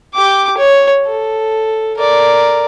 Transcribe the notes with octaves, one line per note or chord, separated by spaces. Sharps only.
G4 D6
C#5
A4
A#4 D5